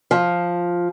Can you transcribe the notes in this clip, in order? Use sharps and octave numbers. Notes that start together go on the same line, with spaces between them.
F3